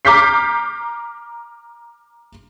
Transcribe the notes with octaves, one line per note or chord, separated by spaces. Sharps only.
A#5 D6 F6 G6 B6 C7